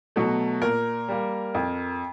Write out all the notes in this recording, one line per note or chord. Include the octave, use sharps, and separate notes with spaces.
B2 F#3 A3
A#2 A#4
G3 A#3
F2